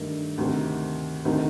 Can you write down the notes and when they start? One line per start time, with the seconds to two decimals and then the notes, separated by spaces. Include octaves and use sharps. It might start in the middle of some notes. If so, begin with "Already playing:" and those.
Already playing: G2 D#3 A3 D4
0.38 D2 C3 D#3
1.25 D2 C3 D#3 A3 D#4